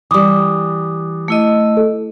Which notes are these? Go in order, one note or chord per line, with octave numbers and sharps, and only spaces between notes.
E3 G3 D6 D#6
A3 E4 D#5
A4